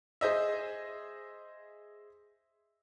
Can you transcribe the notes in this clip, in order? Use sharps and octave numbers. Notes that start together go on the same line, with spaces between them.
G#4 C5 D#5 E5